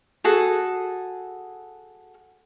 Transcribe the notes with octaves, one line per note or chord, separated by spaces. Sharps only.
F#4 G#4 A4 G#5